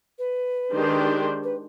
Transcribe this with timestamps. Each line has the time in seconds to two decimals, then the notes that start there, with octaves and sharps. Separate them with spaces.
0.18 B4
0.72 D#3 G#3 D4 G4 C5
1.44 B4